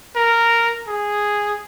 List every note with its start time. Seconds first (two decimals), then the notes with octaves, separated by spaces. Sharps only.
0.16 A#4
0.88 G#4